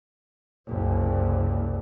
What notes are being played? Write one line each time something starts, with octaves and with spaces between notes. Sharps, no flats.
F#1 C2